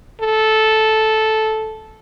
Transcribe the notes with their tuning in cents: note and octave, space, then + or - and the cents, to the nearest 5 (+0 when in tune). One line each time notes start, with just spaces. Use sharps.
A4 -10